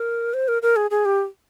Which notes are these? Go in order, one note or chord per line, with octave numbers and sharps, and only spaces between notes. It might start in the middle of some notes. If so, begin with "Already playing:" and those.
Already playing: A#4
C5
A#4
A#4
G#4
G#4
G4